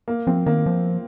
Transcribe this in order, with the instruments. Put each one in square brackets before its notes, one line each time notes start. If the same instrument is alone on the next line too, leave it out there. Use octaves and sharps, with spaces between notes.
[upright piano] A#3
[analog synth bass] F3 [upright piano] C4
[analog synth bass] D#3 [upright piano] A#3
[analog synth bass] F3